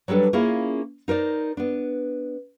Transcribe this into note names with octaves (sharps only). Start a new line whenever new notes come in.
F#3 G3 D4 A4 B4
A#3 C#4 E4 F4 G#4 A#4
D#4 A#4 C5 D5
B3 D4